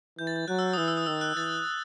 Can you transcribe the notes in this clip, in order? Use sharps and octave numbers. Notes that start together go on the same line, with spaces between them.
E3 G6
A6
G6
F#3 F#6
E6
D#6
E3 E6
E6
D#6
D#3 E6
F#6
E3 A6